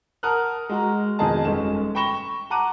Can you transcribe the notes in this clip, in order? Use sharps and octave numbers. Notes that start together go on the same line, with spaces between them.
A#4 F#5 A5 D#6 F6 F#6
G#3 F#4 A#5
F2 B2 D#3 G#4 D#5 A5
G1 G#3 A3 C#4 E7
G5 B5 C#6 A#6 E7 G7
F#5 A5 A#5 D6 F#6 D#7